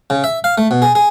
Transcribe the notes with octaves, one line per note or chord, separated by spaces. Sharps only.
C#3
E5
F5
A3
B2
G#4
G#4